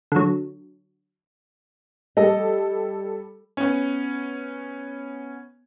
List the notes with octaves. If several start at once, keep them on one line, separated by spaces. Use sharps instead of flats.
D3 F#3
G3 A4 D#5
B3 C#4